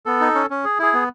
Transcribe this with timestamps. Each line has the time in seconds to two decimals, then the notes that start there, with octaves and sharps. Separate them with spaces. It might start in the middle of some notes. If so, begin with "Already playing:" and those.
0.06 B3 A4
0.21 D#4
0.35 C#4
0.50 C#4
0.64 G#4
0.79 E4 G#4
0.93 B3